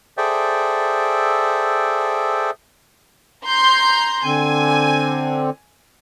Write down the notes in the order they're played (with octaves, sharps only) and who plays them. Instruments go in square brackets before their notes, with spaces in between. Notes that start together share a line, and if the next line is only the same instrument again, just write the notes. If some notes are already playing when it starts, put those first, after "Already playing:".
[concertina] G#4 A4 C5 D5 E5 G5
[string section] A#5 C6 G6
[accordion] D3 C4 [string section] G#5